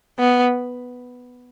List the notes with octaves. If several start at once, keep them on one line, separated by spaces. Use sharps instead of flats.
B3